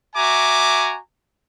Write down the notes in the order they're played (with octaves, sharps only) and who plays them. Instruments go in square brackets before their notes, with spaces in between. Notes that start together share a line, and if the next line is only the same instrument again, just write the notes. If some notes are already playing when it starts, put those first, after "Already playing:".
[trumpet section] F#4 E5 G#5 A#5 D6